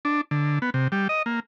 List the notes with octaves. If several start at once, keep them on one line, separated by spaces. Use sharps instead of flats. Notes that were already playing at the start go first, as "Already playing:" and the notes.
D4
D3
B3
C3
G3
D#5
A#3